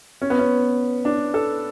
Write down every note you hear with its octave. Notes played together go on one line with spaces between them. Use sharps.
C#4
B3
C#4
D4
A4